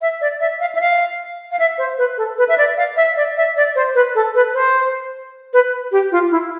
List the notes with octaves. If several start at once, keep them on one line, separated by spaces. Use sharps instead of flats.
E5
D5
E5
F5
E5
F5
F5
E5
C5
B4
A4
B4
E5
D5
F5
E5
D5
E5
D5
C5
B4
A4
B4
C5
B4
G4
F4
E4